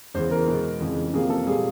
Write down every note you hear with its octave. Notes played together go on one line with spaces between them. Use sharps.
E2 C#3 E3 C5
A#4
B2 G#3 B3
F2 C#3 E3
F2 C3 F3 A#3 G#4
A4
A#2 G3 A#3 G#4